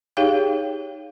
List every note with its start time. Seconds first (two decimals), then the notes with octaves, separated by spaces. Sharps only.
0.17 D#4 G4 G#4 C#5 F5 G5